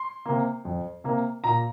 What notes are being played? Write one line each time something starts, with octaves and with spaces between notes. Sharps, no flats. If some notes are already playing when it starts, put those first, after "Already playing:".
Already playing: C6
C3 A#3
F2
C3 A#3
A#2 A#5